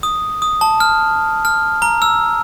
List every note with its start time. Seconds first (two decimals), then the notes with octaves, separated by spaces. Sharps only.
0.03 D#6
0.42 D#6
0.61 A5
0.80 F6
1.45 F6
1.82 A#5
2.02 E6